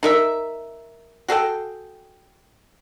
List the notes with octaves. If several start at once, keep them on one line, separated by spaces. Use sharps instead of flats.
D#4 A#4 E5
F#4 G#4 A4 G5